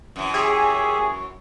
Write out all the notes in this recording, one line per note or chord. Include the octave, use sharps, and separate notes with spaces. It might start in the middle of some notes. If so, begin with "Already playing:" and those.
F#2 E3
G4 G#4 C#5 E5